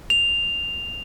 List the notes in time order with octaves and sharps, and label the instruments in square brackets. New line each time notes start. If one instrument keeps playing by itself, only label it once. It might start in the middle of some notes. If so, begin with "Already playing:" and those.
[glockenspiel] F7